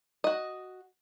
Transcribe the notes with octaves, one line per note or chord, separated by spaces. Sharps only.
F#4 D#5